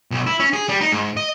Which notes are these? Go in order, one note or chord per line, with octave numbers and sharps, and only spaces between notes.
B1
E4
C#4
G#4
G3
D#4
G#2
D#5